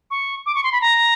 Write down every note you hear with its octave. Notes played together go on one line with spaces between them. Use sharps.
C#6
D6
C#6
C6
B5
A#5